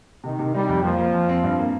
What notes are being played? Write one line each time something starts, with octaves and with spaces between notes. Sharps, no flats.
C3 D#3
C3
G3 D#4
F2
F3 A#3
A#3
F2
C4
G2
A#3